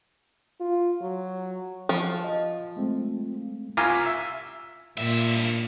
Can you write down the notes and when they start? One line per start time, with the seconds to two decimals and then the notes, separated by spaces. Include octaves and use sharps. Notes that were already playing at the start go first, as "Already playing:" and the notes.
0.60 F4
1.01 F#3
1.89 F3
2.24 D#5
2.77 G#3 A3 C4
3.77 C2 F4 G#5 A#5 D6
4.06 E5
4.97 G2 A#2 E5